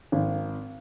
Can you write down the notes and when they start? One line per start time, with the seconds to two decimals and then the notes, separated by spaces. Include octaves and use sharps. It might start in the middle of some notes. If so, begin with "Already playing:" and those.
0.12 G#1